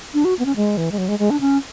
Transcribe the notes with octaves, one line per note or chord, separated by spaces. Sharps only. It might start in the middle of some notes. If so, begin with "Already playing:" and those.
D4
F#4
B3
C#4
G#3
E3
G#3
F#3
G#3
G#3
D4
C#4